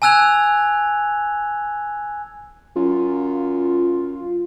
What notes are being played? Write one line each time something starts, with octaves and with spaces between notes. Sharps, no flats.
G#5 A5 E6 F#6 G#6 F7
F#2 F4